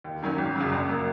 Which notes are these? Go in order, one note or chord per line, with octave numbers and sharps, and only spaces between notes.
D#2
D#3 F#3 C#4
G#1
F#2 C#3 F#3
A#1
F#3 A#3